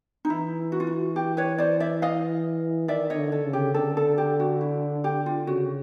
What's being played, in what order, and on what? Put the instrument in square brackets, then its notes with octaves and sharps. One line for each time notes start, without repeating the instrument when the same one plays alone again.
[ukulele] D#4
[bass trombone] E3 [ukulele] E4
[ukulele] F#4
F4
F#4
G4
B4 C#5
C5 D5
D5 E5
D#5 F5
[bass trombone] D#3 [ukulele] D5 E5
[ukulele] C#5 D#5
[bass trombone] D3
[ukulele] A4
[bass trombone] C#3
[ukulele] G4
[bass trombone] D3 [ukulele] A4
[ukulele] A4
G4
F#4
E4
G4
F4
[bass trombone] C#3 [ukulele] F#4